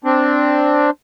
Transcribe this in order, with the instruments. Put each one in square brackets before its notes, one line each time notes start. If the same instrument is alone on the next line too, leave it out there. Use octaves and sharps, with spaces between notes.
[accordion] C4 D4